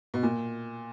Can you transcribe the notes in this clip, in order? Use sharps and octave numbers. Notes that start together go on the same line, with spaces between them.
B2
A#2